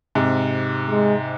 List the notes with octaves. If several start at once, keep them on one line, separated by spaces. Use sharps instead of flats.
G#2 C3
G#3